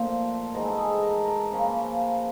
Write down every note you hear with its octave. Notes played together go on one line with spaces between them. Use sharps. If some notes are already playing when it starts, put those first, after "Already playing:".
Already playing: A#2 F3 A3 C5
G#2 E3 G#3 A#4
A4
G#4
A4
A#4
A4
A#4
C#3 F3 A#3 C#4 B4